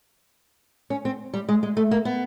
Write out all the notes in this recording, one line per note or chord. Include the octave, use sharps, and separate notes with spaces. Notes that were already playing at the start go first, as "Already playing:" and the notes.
C#4
C4
G3
G#3
G#3
A3
A#3
B3